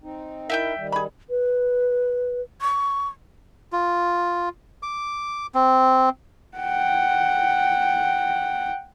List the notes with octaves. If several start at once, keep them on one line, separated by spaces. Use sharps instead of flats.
C4 D#4
D#4 E4 A#4 E5 G5 G6
D#3 G3
G#4 B5
B4
C#6
F4
D6
C4
F#5 G5